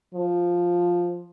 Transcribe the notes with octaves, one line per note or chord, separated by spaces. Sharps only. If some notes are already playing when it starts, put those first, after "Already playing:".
F3